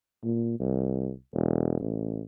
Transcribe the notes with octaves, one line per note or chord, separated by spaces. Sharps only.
A#2
C2
E1
A1